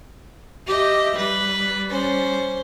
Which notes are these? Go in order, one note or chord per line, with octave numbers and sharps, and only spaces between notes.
G4 D#5 E5
G3 B4
C#4 C5